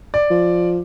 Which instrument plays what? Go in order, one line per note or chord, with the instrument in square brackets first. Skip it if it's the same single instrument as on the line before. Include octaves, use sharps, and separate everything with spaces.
[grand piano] D5
[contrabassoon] F3